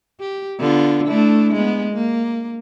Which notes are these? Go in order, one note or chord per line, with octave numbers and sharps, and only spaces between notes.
G4
D3 B3 F4
A3 D4 E4
G#3 B3
A#3